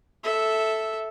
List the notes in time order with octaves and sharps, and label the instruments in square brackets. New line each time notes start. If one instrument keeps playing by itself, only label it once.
[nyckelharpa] A4 E5